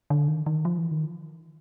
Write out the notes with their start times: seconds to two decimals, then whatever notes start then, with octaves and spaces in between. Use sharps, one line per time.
0.10 D3
0.28 D#3
0.46 D#3
0.65 F3
0.78 E3
0.91 D#3